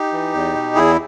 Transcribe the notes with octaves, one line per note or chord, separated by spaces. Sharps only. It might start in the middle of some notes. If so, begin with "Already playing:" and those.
Already playing: D#4 G4
E3
E2
B2
E2 E4 G#4